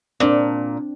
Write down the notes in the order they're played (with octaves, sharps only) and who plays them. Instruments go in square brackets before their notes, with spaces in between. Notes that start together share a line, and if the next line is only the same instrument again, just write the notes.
[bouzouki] A#2 [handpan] C4 D4